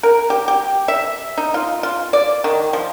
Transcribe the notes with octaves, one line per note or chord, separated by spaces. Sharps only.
A#4
G4
G4
E5
D#4
F4
F4
D5
D#3
F3